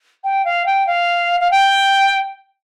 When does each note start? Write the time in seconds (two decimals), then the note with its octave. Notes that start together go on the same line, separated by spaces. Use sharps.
0.24 G5
0.45 F5
0.66 G5
0.87 F5
1.40 F5
1.51 G5